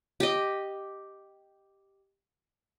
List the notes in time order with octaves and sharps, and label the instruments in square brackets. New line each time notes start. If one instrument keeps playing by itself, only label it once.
[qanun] G4 D#5